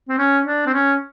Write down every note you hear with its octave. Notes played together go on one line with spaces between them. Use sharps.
C4
C#4
D4
C4
C#4